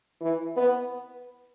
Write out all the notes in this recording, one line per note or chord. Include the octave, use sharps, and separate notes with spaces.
E3
B3